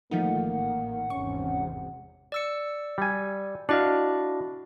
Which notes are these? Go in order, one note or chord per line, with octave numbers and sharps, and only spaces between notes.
A1 D#3 F3 A3 A#3 D#4 F#5
G#1 E2 C3 C#4 C#6
D5 E6 C#7
G3 G#5
D4 E4 F#4 D#5 F5